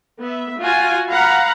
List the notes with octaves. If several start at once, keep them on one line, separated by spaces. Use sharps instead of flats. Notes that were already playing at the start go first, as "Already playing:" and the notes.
B3 E5
F4 F#4 G#5
F5 F#5 A#5 B5